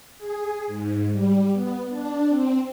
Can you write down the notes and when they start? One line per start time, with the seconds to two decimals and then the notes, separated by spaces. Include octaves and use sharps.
0.18 G#4
0.67 G#2
1.12 G3
1.53 B3
1.89 D4
2.29 C4